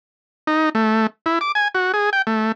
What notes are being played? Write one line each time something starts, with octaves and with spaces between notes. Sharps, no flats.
D#4
A3
E4
D6
G#5
F#4
G#4
G5
A3